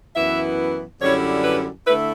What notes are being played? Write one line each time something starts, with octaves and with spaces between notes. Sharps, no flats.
F#2 E3 B3 E4 E5
F#2 D3 G3 C#4 E4 C#5
B4
D3 A3 E4 B4